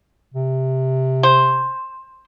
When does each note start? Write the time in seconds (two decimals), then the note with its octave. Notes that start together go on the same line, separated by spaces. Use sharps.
0.34 C3
1.23 C5